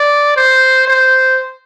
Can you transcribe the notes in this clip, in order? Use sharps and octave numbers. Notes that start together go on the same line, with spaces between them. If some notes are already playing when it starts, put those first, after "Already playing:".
Already playing: D5
C5
C5